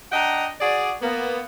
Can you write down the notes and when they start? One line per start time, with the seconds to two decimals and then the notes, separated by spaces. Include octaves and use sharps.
0.11 D4 D#5 F#5 G5 A#5
0.60 F#4 G#4 D5
1.02 A#3 B3